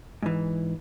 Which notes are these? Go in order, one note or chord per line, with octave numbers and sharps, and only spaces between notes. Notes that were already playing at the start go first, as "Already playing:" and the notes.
G#2 E3